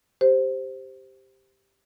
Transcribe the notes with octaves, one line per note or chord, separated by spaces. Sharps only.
G4 C5